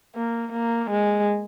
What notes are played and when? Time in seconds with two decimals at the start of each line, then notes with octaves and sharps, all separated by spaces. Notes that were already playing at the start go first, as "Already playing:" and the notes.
0.16 A#3
0.53 A#3
0.90 G#3